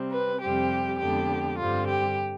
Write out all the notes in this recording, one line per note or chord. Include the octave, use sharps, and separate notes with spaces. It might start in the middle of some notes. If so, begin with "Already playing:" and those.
Already playing: C3 G3 C4
B4
F2 C3 G3 C4 G4
F2 D3 G#3 B3 D4 G4
G2 D3 G3 C4 F4
G4